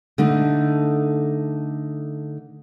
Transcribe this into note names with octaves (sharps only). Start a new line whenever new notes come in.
D3 A3 D4 D#4